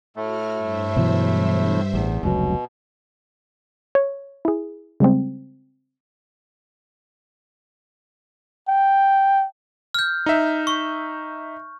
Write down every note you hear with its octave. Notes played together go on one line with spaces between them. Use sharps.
A2 A3 F#4 F6
G2 C5 E5
B2 E3 F#3
A1 E2
F1 C#2 B2 F#3
C#5
E4 G#4
C#3 G3 G#3 C4
G5
F6 G6
D#4 E5
C#6